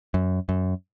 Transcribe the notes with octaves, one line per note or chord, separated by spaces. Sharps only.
F#2
F#2